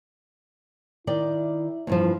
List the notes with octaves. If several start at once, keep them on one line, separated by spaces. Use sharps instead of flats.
D#3 E4 D5 G5
E2 G2 F3